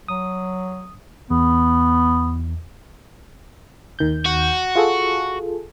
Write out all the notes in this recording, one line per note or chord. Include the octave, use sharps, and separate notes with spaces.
F#3 D#6
E2 B3
D#2 D#3 G6
F#4
F4 G#4 A4